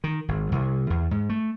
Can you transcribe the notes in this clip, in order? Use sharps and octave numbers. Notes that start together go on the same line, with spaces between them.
D#3
G#1
C2
E2
G#2
A3